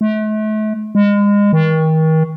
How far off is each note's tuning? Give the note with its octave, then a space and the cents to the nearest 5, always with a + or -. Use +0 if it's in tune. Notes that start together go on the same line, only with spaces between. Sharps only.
A3 -40
G#3 -30
D#3 +35